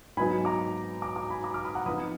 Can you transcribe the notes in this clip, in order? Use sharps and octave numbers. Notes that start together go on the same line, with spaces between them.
G#2 F#3 B3 D#4 G#5 B5
A#5 D6
A#5 D6
A#5 D6
G#5 B5
A#5 D6
D6 F6
B5 D#6
F#5 A#5
F2 F3 B3 D#4 B5 D#6